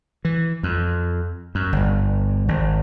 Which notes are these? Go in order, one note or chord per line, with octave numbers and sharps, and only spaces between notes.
E3
F2
F#2
G1
G#1